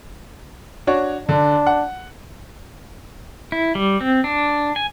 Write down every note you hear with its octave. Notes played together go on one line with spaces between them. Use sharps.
D4 F#4 C#5
D3 D4
F#5
E4
G3
C4
D4
G#5